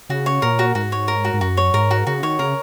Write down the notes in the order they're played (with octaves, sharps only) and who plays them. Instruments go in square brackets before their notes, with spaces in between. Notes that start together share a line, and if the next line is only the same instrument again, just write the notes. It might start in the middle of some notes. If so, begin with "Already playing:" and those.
[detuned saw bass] C#3 [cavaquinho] F#4
[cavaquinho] C#5
[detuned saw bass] A#2 [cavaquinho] A#4
[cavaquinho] F#4
[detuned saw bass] G#2 [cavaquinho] F#4
[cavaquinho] C#5
A#4
F#4
[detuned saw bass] G#2
[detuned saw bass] F#2 [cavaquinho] F#4
[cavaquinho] C#5
[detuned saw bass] G#2 [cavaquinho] A#4
[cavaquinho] F#4
[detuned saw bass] C#3 [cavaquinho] F#4
[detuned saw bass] D#3 [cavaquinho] C#5
[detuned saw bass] C#3 [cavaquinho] A#4